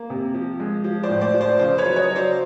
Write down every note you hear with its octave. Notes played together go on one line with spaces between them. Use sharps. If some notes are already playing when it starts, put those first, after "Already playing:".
Already playing: A#3
C3
F3
G#3
F3
C5 D5
A2
C5 D5
F3
C5 D5
C#3 C5 D5
B4 C#5
F#3
C#5 D#5
F#3
C5 D5